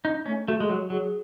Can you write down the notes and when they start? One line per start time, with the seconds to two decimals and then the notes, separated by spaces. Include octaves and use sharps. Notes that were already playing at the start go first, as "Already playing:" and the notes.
0.04 C#4 D#4
0.26 A3 C#4
0.48 A3 F#4
0.60 G#3 G#4
0.69 F#3 F#4
0.90 F#3 G#4